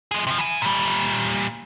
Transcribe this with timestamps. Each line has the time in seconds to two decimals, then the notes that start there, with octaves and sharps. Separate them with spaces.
0.11 F3 G#4
0.27 C3 F3
0.38 E3 G#5
0.62 A#2 G3